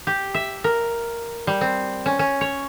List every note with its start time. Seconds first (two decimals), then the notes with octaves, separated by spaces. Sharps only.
0.07 G4
0.34 E5
0.64 A#4
1.47 G3
1.61 C4
2.06 C#4
2.19 C#4
2.41 C#5